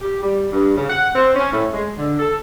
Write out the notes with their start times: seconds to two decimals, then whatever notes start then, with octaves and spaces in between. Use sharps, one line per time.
0.01 G4
0.22 G3
0.52 G2
0.77 C#3
0.90 F#5
1.15 C4
1.36 C#4
1.52 A2
1.73 G#3
1.97 D3
2.19 A4